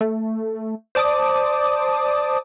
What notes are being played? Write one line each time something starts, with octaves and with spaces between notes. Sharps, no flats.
A3
C5 D5 A5 D6 D#6